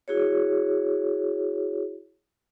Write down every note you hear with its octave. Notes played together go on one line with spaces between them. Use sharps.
E4 F#4 G#4 C#5